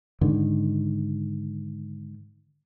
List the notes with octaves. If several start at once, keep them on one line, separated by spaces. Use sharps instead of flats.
G#2 D3 D#3